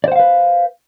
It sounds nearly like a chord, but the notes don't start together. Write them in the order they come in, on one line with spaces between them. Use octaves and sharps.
D5 C5 F#5 F5 B4